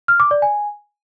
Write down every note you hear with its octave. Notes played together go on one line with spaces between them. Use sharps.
F6
D6
D5
G#5